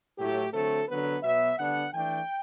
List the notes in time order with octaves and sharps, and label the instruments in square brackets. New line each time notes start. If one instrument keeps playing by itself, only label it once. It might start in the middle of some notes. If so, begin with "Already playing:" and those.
[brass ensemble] A2 F#3 A3 E4 G4
D3 F#3 A3 C4 A4
D3 F#3 B3 B4
B2 F#3 B3 E5
D3 G3 B3 D4 F#5
E3 A3 D4 G5